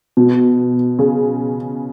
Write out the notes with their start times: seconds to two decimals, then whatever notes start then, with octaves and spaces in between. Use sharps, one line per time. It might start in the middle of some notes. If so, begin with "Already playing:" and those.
0.17 B2
0.99 C#3